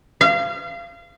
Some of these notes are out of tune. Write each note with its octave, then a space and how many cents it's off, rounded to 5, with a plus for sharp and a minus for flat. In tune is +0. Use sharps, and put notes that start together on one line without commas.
F5 -30